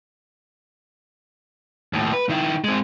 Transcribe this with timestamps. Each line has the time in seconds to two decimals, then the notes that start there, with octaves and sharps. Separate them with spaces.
1.93 D#2 A2
2.13 B4
2.29 D#3 E4
2.64 G#3 C4